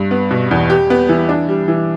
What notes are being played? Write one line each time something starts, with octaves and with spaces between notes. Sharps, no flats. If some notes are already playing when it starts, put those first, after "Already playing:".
Already playing: G2
B3
B2
E2
G4
B3
E3
D4
G3
E3